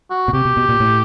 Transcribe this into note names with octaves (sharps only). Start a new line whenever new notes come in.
F#4
B2
C3 G4
B2
B2
A#2
A2